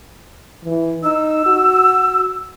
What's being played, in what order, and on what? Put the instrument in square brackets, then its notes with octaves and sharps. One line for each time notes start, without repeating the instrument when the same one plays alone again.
[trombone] E3
[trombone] D#4 [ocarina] E6
[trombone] F#4